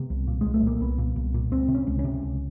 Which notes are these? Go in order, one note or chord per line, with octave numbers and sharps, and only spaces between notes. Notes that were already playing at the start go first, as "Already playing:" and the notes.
Already playing: C3 B3
C2
A#2
C2 G#3
A3
A#2 A#3
C2 B3
A#2
C2
A#2
C#2 C4
C3
C#4
C#2
C#4
C3
C#2